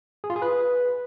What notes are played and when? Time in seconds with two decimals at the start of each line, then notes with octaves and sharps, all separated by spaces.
0.24 G#4
0.30 F4
0.36 G#4
0.42 B4